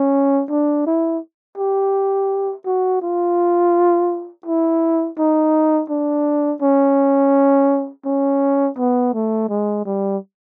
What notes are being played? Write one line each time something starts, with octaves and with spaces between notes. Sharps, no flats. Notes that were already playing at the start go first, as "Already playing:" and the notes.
Already playing: C#4
D4
E4
G4
F#4
F4
E4
D#4
D4
C#4
C#4
B3
A3
G#3
G3